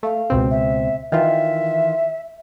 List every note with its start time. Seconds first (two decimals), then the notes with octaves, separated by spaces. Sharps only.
0.03 A3 F5
0.30 C#2 B2 C4
0.50 E5
1.12 D#3 E3 F4 E5